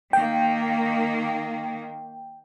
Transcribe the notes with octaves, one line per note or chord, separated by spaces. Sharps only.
D#3 A#3 G5